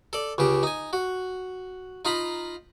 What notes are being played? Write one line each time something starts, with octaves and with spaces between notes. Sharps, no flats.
A4 D5
C#2 C#3 G4
D#4 G#5
F#4
D#4 F4 A#5 B5